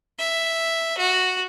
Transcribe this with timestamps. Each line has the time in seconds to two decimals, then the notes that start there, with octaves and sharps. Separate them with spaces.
0.19 E5
0.98 F#4